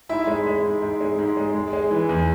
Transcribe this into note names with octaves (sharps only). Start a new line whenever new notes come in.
G#2 E4 E5
G#3
G#3
G#2
G#2
G#3
G#2
G#3
G#3
G#3
E3
E2